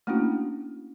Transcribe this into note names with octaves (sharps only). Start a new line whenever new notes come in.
A3 A#3 C#4 D4 E4 F#4